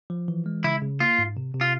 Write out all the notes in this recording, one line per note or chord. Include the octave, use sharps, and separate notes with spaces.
F3
E3
G#3
C#3 E4
C#3
A#3 F4
G#2
C3
C3
F4